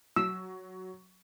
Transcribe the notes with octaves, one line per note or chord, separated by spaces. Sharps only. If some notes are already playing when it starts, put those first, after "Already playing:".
F#3 E6